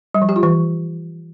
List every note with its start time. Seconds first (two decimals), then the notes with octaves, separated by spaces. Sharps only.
0.15 G3
0.22 F3
0.29 G4
0.36 F4
0.43 E3